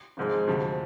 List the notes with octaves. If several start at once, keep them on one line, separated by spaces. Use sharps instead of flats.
G#1 G#2 F3 G#3
D2 C3 F3